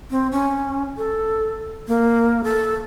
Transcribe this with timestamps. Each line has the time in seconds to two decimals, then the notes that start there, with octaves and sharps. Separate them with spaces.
0.10 C4
0.32 C#4
0.97 A4
1.88 A#3
2.44 A4